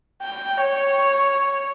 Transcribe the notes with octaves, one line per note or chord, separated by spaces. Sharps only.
G5
C#5